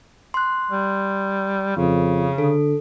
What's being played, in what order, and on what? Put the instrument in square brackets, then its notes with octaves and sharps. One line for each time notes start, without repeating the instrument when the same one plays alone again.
[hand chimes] C6 F#6
[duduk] G3
[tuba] F2 [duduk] C#3
[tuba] D3 [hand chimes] A4